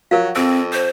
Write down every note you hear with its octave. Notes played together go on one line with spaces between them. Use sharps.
F3 F#3 F#4 A#4 F5
F2 C4 E6 A#6
C5